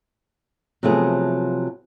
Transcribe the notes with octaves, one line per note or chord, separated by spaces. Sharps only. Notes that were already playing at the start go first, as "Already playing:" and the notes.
C3 F3 F#3 A3 B3 G#4